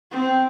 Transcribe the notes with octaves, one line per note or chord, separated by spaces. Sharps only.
C4